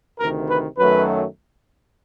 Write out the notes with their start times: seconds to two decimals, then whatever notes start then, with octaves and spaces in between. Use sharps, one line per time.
0.20 D2 C3 D#3 A#4
0.49 B4
0.79 F#2 D#3 F#3 A3 B4